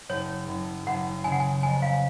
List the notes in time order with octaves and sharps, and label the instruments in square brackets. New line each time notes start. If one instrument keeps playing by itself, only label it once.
[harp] F#1 [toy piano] C#5
[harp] F#1
[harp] F#1 [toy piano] F#5
[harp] C#3 [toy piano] G#5
[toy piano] F#5
G#5
[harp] F2 [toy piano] G#5
[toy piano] F5